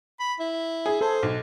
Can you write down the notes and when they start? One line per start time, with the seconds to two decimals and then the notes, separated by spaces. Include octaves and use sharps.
0.19 B5
0.39 E4
0.86 G#4
1.01 A4 C5
1.23 B1